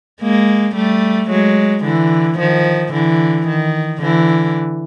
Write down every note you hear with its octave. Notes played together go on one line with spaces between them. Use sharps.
G#3 A#3
G3 A3
F#3 G#3
D3 E3
D#3 F3
D3 E3
D#3
D3 E3